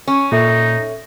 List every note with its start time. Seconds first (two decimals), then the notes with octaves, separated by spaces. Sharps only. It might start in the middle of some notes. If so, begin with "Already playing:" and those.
0.07 C#4
0.32 A#2 D#4 A4 E5